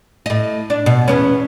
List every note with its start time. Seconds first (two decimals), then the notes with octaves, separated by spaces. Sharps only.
0.26 A2 D#5
0.70 D4
0.86 B2
1.08 E2 B3 C#4